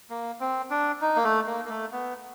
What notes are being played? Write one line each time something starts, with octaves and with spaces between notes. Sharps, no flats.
A#3
C4
D4
D#4
A#3
A3
A#3
A#3
A3
B3